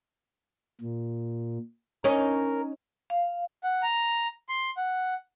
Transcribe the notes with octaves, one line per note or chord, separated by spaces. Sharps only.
A#2
C#4 D#4 A#4
F5
F#5
A#5
C6
F#5